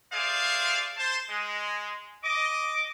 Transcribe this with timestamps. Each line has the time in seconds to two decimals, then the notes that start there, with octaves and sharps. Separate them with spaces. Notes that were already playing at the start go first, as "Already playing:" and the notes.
0.12 G#4 A4 C5 D5 E5 F5
0.97 C5 A5
1.30 G#3
2.24 D#5 D6